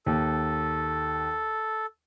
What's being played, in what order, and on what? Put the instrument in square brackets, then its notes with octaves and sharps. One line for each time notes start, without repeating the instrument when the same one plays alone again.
[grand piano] D#2 [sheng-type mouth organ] A4